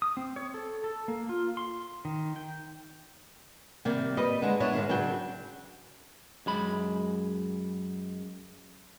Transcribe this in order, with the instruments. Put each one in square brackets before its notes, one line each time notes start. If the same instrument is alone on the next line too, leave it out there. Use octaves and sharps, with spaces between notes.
[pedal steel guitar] D#6
C4
C#5
A4
A4
A#3
F4
C6
D#3
G5
[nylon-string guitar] C3 D#3 G3 A#3
G3 B4 D#5
D3 G#3
B3 D4 E4 C#5
G#2 D#3 G#3
C#3 F#3 D4 G5
[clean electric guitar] F#2 G#3 B5